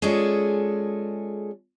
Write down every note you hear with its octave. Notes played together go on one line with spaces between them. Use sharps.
G#3 C#4 F4 G#4 A4 D5